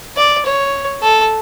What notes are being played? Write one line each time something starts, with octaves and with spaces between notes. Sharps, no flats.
D5
C#5
A4